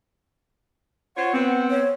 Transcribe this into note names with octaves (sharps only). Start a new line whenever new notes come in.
F4 C5 C#5 F#5
B3 C4
C#5